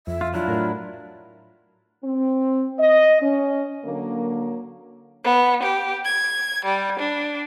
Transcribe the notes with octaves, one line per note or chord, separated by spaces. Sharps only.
F2 E5
F4
F#3 D4 E4 F4
A2 A#4
C4
D#5
C#4
D3 F#3 A#3
B3
G4
G#6
G3
D4